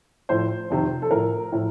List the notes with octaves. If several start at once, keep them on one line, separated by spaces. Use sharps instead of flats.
A2 F3 C5
F2 C3 D#3
A4
A2 F3 A#4
A2 F3